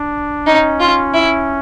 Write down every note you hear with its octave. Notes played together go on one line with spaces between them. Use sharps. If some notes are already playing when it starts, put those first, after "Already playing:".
Already playing: D4
C#4 D#4
F4
E4